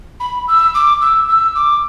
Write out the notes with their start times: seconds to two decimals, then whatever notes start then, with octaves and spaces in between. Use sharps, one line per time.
0.20 B5
0.48 E6
0.75 D6
1.01 E6
1.28 E6
1.55 D6